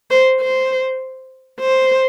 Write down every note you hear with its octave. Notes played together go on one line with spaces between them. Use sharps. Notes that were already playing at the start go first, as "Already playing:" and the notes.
C5
C5
C5